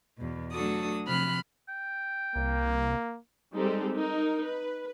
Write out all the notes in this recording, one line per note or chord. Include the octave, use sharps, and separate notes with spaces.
E2 B2
F#3 A3 D4 F#4 A4 D#6
C3 F3 B5 F6 F#6
G5
C2 A#3
G3 G#3 C4 D#4 G4 A4
D#4 A#4
B4